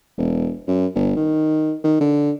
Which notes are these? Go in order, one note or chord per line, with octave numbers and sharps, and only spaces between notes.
E1
F#2
G1
D#3
D#3
D3